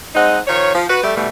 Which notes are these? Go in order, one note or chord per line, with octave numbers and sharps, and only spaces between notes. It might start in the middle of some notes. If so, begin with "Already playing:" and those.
G#3 C4 D#4 D#5 F#5
D#3 F3 C#5
F3
F#4 B4
G3 A3
B2 E3 G3 A3